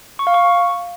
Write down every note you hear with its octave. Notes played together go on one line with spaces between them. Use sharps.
C#6
F5
C#6